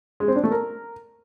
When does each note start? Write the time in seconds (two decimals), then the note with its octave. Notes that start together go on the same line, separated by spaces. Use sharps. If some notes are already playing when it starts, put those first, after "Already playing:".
0.20 G#3
0.28 C4
0.36 D4
0.44 A3
0.51 A#4